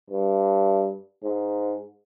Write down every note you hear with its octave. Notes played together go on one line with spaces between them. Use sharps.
G2
G#2